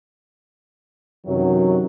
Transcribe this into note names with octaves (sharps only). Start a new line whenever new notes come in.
F#2 C3 D#3 E3 F#3